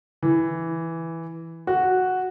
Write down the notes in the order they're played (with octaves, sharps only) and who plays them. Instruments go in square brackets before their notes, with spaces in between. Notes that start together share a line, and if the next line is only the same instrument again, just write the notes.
[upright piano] E3
F#4